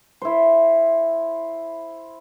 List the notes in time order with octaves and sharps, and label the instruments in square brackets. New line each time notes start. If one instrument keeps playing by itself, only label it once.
[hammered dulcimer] E4 C5